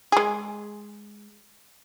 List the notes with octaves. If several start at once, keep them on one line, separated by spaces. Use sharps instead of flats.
G#3 G#4